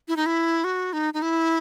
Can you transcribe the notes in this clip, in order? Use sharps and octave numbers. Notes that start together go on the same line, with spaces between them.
E4
D#4
E4
F#4
D#4
D#4
E4